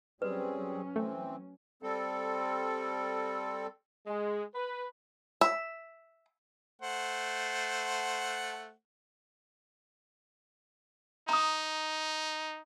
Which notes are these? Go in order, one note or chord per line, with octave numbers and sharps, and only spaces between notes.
F#3 G3 C4 C#4 G#4 B4
E3 A3 C4
G3 C4 A4
G#3
B4
E5
A3 C5 F#5
D#4 A#5 D#6